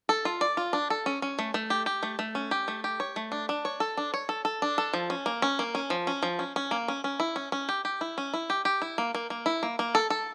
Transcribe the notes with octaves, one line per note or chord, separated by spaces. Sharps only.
A4
F4
D5
F4
D4
A4
C#4
C#4
A3
A3
G4
G4
A3
A3
C#4
G4
A3
G4
C#5
A3
D4
D4
C#5
A4
D4
C#5
A4
A4
D4
A4
F3
C#4
A#3
C#4
A#3
C#4
F3
C#4
F3
C#4
C#4
A#3
C#4
C#4
E4
C#4
C#4
G4
G4
E4
C#4
E4
G4
G4
E4
A#3
A#3
A#3
E4
A#3
A#3
A4
A4